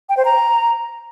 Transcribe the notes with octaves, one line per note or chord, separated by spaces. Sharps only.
G5
C5
A#5